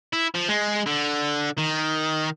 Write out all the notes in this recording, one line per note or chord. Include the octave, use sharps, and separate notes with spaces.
E4
F3
G#3
D3
D#3